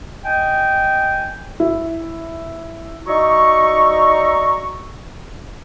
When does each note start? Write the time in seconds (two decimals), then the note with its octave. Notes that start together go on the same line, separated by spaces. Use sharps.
0.25 D#5 G5 G#5
1.60 E4
3.07 D#4 F#4 D5 E5 A#5 C#6